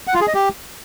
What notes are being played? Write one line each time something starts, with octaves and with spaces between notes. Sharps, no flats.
F#5
F4
G#4
D#5
G4